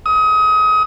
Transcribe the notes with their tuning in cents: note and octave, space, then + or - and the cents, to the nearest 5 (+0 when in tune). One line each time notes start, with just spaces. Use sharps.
D#6 +30